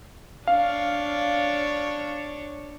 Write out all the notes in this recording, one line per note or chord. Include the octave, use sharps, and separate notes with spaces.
D4 C#5 F5